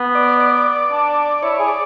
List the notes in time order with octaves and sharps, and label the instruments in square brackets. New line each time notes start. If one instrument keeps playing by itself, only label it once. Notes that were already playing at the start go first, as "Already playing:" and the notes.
Already playing: [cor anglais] B3
[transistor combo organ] D5
D5
[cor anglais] D4
[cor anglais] E4 [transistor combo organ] C#5
[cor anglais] G#4
[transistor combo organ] D5